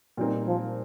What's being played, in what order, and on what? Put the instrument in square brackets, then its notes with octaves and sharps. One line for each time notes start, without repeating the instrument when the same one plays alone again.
[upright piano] A#2 G3 C4 D#4 A#4
[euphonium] F3